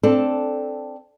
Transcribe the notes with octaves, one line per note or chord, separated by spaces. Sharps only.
C4 D4 A4